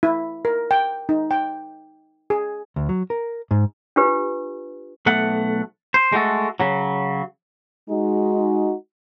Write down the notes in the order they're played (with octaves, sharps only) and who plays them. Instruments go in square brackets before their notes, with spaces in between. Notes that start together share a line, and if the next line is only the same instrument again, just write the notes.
[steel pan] E4
A#4
G5
D#4
G5
G#4
[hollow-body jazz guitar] D2
F#3
A#4
G#2
[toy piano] D4 F4 G4 B4
[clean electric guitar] B1 A3 F#5
C5
G#3 A3 F#4 A4
C#3 F#3
[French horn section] G#3 D#4 F#4